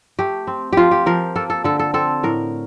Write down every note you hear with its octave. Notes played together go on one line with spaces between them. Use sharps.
A3 G4
C4
F3 F4 G4
G4
F3 A#4
A#3 A4
A4
D3 A4
A4
C4 A4
A2 A#4